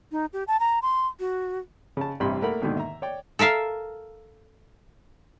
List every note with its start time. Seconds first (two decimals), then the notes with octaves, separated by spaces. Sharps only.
0.12 D#4
0.33 G4
0.48 A5
0.60 A#5
0.82 C6
1.20 F#4
1.97 C#3 A5
2.20 A1 G2 C3 B5 C6
2.42 A3 A#3 A#4 F#5 B5
2.61 D#2 G#2 B2 D3 D#3
2.77 E5 A#5
3.02 C#5 D5 G5
3.39 A4 A#4 E5 F5